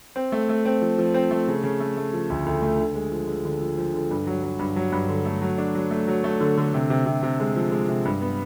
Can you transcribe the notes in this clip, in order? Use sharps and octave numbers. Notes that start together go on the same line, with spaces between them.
C4
A3
A3
C4
F3
F3
C4
A3
C#3
C#3
A3
A3
F3
D2
D2
A3
D3
G#3
F3
G#3
D3
F3
F3
D3
G2
F#3
F#3
G2
F#3
G2
D3
A3
F#3
D4
F#3
A3
F#3
A3
D3
D3
C3
C3
C3
C3
G#3
F3
G#3
C3
G2
B3